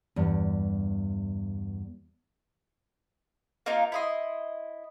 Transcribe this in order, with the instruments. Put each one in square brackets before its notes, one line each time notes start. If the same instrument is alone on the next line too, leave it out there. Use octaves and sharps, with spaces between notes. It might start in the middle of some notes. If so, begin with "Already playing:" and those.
[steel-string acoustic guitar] E2 G2
[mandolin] A#3 D#4 F4 A#4
E4 D#5 C6